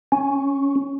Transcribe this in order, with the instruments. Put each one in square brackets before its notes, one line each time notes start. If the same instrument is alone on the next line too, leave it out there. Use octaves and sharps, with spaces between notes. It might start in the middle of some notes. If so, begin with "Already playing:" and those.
[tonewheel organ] C#4